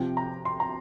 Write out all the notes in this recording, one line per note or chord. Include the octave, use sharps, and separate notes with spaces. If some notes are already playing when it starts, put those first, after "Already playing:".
Already playing: C3 F3 G5
A#5
C6
A#5